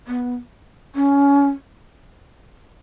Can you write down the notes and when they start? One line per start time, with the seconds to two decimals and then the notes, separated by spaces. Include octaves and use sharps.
0.07 B3
0.95 C#4